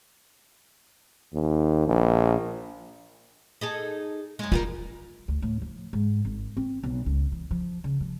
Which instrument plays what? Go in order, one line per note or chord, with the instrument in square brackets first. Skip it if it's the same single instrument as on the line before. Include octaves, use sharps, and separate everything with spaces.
[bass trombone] D#2
A#1
[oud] D#4 G#4 A4
F#2 G#3
[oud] G3 G4 A#4 [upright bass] F4
[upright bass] D2
A2
F3
G#2
G#1
C4
B1
C#2
E3
F3
C#3
F3